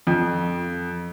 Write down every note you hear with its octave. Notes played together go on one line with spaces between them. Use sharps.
F2